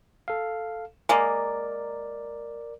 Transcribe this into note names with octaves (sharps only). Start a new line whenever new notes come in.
A4 F5
G#3 A#3 A#4 D5